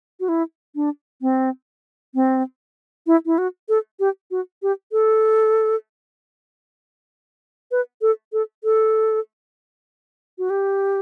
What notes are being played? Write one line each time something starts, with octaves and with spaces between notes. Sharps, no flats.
F#4
E4
D4
C4
C4
E4
E4
F#4
A4
G4
F#4
G4
A4
B4
A4
A4
A4
F#4
G4